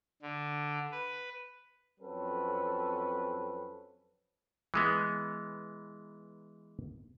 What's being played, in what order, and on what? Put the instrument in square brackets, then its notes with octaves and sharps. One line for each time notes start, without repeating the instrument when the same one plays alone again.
[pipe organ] D3
B4
[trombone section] F2 F#3 C4 C#4 A4 B4
[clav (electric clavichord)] E3 G#3 B3